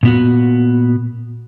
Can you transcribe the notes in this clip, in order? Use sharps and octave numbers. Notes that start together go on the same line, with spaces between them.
A#2 B3 F#4